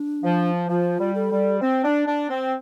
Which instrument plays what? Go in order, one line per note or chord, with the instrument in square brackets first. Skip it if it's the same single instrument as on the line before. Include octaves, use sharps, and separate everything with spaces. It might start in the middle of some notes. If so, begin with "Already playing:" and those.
Already playing: [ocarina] D4
[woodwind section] F3
[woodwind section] F3 [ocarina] F4
[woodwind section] G3
[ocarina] A4
[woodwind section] G3
C4
D4
D4
C4